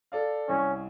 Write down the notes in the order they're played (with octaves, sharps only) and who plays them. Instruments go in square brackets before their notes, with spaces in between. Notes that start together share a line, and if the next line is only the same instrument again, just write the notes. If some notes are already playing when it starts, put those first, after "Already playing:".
[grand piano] A4 D5 F5
[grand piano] C2 [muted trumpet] C#4